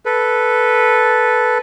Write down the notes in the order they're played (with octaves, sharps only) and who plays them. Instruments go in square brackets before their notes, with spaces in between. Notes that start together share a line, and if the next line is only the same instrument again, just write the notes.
[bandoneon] A4 B4